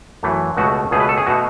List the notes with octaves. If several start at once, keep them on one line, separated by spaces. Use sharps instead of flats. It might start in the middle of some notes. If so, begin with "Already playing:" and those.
F#2 E3 A3
C#2 B2 A3 F#4
C#2 B2 A3 G#4
B4
A4
G#4
B2 A3 F#4